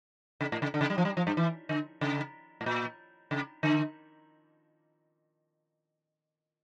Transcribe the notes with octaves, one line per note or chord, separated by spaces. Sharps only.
C#3
A2
C#3
D3
C#3
G3
F3
G3
F3
G2
E3
D3
C#3
A2
A#2
C#3
D3